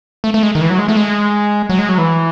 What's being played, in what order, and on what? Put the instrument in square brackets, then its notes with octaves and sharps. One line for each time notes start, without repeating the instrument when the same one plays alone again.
[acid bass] A3
A3
G#3
D#3
E3
F#3
G#3
A3
G#3
F#3
G#3
F#3
E3